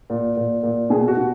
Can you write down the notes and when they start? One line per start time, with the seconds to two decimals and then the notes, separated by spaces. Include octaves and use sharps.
0.10 A#2
0.37 A#2
0.63 A#2
0.90 B2 G#4
1.08 F#4
1.17 B2